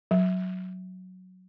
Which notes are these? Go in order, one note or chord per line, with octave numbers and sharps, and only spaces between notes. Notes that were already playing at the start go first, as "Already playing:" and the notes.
F#3